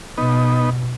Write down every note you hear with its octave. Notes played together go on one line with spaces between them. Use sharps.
B2 B3 D#4